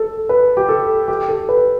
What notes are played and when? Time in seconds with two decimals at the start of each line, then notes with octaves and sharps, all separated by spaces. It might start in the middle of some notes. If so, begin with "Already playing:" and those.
Already playing: A4
0.29 B4
0.57 G4
0.69 A4
1.08 G4
1.29 A4
1.49 B4